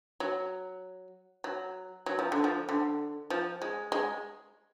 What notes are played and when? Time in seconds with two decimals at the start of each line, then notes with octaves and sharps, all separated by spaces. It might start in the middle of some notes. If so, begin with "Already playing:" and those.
0.20 F#3
1.44 F#3
2.06 F#3
2.19 F3
2.32 D3
2.44 F3
2.69 D3
3.30 F3
3.62 G#3
3.92 G#3